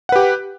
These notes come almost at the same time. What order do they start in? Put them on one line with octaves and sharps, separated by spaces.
F#5 B4 G4